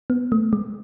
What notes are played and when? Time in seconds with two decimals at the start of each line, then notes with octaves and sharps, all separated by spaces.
0.10 B3
0.32 A3
0.53 G#3